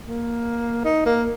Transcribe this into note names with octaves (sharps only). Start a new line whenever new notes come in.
A#3
D#4
A#3